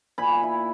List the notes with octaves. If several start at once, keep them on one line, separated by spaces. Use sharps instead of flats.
A#2 G#5 B5
E4